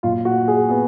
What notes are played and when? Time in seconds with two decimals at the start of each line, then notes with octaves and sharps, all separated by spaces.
0.03 A#2 F#3 F4
0.25 F#4
0.48 G#4
0.69 B3